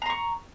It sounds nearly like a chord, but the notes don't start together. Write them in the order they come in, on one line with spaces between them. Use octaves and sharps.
A#5 C6 C#6